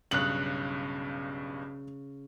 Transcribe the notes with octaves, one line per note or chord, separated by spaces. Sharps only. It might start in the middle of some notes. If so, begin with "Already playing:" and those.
B1 G2 C#3 F#6 F#7